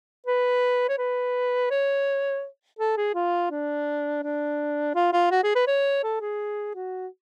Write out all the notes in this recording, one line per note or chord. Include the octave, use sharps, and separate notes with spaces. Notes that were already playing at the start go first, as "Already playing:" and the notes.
B4
C#5
B4
C#5
A4
G#4
F4
D4
D4
F4
F4
F#4
G#4
B4
C#5
A4
G#4
F#4